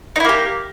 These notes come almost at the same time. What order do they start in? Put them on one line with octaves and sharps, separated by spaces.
D#4 E4 A#3 G4